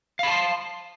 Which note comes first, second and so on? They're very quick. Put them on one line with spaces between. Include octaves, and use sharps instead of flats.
F5 B5 A5 C6